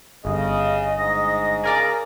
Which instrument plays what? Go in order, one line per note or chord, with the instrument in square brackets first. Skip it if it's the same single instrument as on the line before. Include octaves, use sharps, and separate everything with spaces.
[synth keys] G1 [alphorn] C#3 [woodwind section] D#5
[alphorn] G#2 [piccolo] A#6
[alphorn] C#3 [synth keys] G#4 A#4 D5 [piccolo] A#6